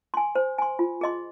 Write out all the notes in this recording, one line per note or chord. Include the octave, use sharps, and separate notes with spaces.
G#5 C6
C5
G#5 C6
F4
G#4 D#5 C6